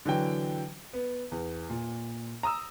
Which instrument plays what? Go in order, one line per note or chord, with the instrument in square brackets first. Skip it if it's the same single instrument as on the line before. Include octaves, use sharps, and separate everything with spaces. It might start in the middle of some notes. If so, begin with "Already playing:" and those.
[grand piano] D3 E3 F#3 G5
B3
E2
A#2
A#5 D#6 E6